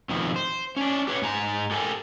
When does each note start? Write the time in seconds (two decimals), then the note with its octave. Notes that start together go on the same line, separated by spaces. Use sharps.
0.09 F2 B2 D#3 F3
0.36 C5
0.76 C#4 D4
1.07 G4 B4 C#5
1.22 G#2 G#5 A#5
1.71 G4 A4 A#4 G#5